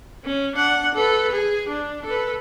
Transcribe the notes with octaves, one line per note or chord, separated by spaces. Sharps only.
C#4
D4 F#5
A4 B4
G#4
D4
A4 B4